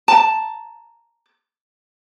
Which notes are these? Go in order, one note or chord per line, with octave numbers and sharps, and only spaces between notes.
A5 A#5